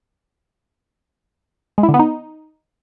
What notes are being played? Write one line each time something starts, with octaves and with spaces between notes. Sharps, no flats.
G#3
E4
D3
B3
D#4